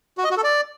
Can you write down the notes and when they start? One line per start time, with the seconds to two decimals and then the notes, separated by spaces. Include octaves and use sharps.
0.18 F#4
0.24 D#5
0.31 F#4
0.37 A4
0.44 D5